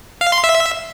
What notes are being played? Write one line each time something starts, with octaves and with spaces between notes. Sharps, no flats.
F5
C6
E5